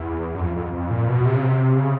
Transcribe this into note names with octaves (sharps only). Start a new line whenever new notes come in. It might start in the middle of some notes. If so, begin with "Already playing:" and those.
Already playing: E2
F#2
F2
F2
F2
A#2
B2
C3
C#3
C3
C#3